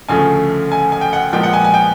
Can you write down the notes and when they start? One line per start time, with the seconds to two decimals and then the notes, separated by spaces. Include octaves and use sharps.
0.08 D2 C#3 F3 A3 G#5
0.72 G#5
0.92 G#5
1.01 G5
1.13 F#5
1.32 A#2 F3 G#3 B3 G5
1.43 F#5
1.53 G#5
1.64 G#5
1.74 G5